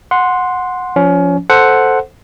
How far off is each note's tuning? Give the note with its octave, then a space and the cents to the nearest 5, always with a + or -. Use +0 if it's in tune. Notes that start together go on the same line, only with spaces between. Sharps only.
F#5 -15 C6 +0
F3 +0 C#4 +25
A4 +0 C5 +0 F#5 +0